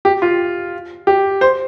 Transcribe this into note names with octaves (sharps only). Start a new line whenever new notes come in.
G4
F4
G4
C5